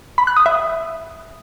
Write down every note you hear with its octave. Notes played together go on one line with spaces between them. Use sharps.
B5
F#6
D#6
E5